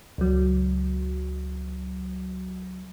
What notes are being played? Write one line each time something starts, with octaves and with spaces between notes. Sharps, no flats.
C#2 F#3